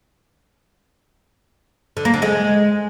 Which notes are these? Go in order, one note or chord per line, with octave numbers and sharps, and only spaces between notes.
D3
A#3
D3
G#3